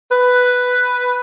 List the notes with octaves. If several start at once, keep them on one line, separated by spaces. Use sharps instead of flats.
B4